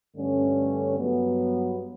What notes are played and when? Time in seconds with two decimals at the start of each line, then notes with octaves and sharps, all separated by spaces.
0.15 G2 D3 A3 C#4
0.98 G2 F#3 B3